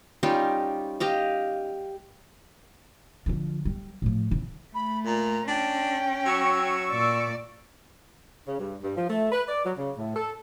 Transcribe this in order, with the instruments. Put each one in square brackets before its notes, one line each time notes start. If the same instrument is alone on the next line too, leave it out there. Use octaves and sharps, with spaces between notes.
[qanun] G3 C#4 D#4 F4
G4 D#5 F5
[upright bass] D3 F3
G3
A2 F3
C#3 E3
[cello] A3 [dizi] B5
[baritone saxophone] A#2 [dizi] A#5
[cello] C#4 [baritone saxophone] D4 [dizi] G5
[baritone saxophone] F#3 [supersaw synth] C#6 E6
[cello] A#2 D5
[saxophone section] C#3
G2
G2
F3
A3
B4
D5
F#3
C#3
A2
A4